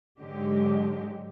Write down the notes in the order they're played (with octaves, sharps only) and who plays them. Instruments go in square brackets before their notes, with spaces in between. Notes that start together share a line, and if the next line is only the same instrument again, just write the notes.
[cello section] G#2 D3 F#3 G#3 G4